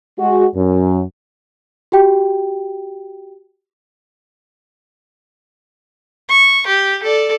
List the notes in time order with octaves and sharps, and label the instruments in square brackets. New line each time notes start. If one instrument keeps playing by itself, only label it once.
[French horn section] G#3 F#4
F#2
[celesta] F#4 G4 G5
[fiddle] C#6
G4
A4 D5